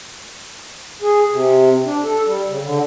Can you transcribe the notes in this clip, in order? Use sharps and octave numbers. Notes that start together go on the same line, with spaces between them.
G#4
C3
D4
A4
G3
C#3
D3